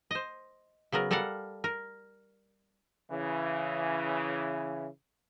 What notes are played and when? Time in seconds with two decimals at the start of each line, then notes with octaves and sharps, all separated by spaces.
0.11 C5 D#5
0.92 C#3 F#3 B3 A#4
1.11 G3 A4 A#4 F5 F#5
1.64 A#4
3.10 C#3 E3